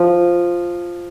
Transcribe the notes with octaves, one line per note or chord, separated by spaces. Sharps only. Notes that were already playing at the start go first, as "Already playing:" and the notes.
Already playing: F3